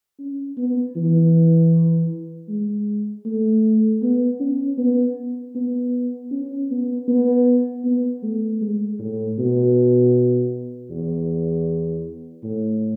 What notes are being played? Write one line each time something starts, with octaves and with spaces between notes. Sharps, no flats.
C#4
B3
E3
G#3
A3
B3
C#4
B3
B3
C#4
B3
B3
B3
A3
G#3
A2
B2
E2
A2